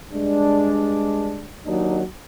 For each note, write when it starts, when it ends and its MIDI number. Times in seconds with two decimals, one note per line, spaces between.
0.13 1.49 43
0.13 1.49 56
0.13 1.49 62
1.66 2.02 39
1.66 2.02 54
1.66 2.02 62
1.66 2.02 63